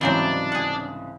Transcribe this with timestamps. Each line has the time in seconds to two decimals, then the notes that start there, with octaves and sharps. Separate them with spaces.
0.01 C2 G#2 C#3 E3 F#3 C4 D4
0.52 G#4 F#5